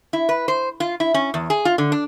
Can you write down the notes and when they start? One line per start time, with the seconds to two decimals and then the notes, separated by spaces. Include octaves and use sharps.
0.13 E4
0.29 B4
0.48 C5
0.80 F4
1.00 E4
1.14 C#4
1.34 E2
1.50 G#4
1.65 F4
1.78 D3
1.92 D4